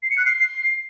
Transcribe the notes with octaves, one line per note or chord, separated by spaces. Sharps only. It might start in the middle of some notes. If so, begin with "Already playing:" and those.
C7
C#7
F#6
C7